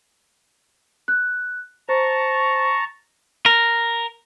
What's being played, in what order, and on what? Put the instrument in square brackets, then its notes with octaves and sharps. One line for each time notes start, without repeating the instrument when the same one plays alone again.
[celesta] F#6
[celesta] C5 [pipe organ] A5 A#5 C#6
[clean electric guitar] A#4